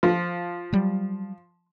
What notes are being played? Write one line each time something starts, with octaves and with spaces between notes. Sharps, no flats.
F3
F#3 G3